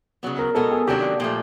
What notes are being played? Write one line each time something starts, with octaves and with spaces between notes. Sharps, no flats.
C#3 F#3 B3
A#4
B2 G#3 B3 A4
G#4
C3 D#3 F#3 A#3 D4 G4
A#2 F3 A3